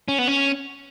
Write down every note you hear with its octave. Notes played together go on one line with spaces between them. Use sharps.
C#4
B3
C#4